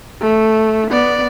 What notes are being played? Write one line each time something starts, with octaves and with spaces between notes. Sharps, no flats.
A3
B3 D5